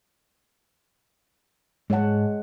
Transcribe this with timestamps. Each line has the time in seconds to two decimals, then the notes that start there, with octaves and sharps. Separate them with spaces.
1.90 G#2 G#3 C#5 F#5 A5